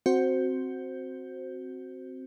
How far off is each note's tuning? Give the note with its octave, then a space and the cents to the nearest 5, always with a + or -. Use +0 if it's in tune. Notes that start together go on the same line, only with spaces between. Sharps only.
C4 +0 F#4 +0 C5 +0